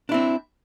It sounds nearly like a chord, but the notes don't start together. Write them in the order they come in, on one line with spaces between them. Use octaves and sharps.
D4 E4 C4